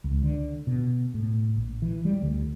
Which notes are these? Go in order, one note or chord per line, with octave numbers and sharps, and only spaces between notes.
C#2
D3
B2
A2
A#1
E3
G3
D2